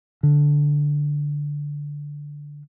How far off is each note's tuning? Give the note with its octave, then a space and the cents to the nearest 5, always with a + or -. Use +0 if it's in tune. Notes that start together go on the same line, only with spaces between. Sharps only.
D3 -5